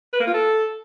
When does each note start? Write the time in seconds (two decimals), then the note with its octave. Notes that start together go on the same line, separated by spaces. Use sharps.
0.13 B4
0.20 A#3
0.27 F4
0.34 A4